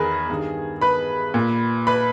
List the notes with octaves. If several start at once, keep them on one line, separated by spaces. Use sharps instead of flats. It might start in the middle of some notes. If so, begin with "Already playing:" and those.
Already playing: E2 D#3 G#4 A#4 B4
G2 D#3
B4 B5
A#2
B4 B5